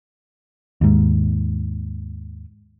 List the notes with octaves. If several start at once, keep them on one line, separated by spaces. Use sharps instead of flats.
D#2 G#2